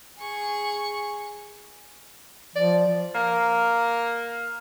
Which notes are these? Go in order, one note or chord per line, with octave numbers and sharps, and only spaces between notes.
G#4 C#6
F3 D5
A#3